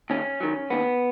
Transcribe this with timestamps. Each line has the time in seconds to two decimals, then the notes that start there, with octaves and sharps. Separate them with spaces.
0.10 D#2 C#4
0.40 D#3 F#3
0.70 D#2 B3